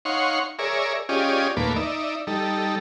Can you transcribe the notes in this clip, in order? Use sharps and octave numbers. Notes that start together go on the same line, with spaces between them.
D#4 C#5 F5 F#5 C6 C#6
G#4 A#4 C#5 D5 E5
C#4 F4 G4 G#4 D5 D#5
D#2 A#2 A3 A#3 B4 D6
D#4 D5 E5
G3 D#4 A4